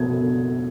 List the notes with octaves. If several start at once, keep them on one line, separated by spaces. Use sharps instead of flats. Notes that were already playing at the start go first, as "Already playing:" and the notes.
Already playing: B2 G#6